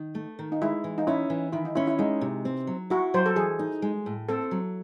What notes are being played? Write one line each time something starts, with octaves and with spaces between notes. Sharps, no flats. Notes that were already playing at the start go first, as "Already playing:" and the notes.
Already playing: D#3
A3
D#3
D#4
G#3 E4
E3
D#4
C#4 E4
E3
D#3 E4
D#4
C#4 E4
E4
G#3 D#4
C3
C4
F#3
E4 F#4
F#3 C5
A4
E3 G#4
D#4
G#3
A2
C4 A4
F#3